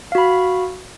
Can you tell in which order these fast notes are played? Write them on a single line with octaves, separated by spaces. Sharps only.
F5 F#4 B5